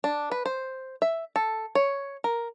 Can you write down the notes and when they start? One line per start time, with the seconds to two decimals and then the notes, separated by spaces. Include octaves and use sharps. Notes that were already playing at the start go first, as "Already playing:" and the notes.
0.04 D4
0.32 B4
0.46 C5
1.02 E5
1.36 A4
1.75 C#5
2.24 A#4